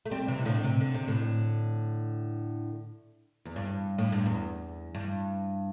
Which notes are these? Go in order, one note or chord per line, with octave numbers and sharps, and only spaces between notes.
A3
G3 C4
C3 E3
A2 D3
C3
D3
C3
A2 D3
E2
G2
A2
G2
E2
G2